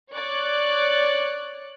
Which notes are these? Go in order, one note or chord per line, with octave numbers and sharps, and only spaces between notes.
C#5 D5 F#6